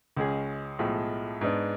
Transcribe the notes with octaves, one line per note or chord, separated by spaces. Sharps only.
C#2 C#3 G#3 C#4 G#4
B1 A2 F3 G#3
G#2 G#3 B3 D4